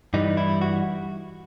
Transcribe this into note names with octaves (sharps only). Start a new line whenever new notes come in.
G2 E3 G3 D#4
E4
F#4